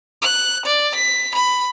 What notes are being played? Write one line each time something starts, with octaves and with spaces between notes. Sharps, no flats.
F#6
D5
B6
B5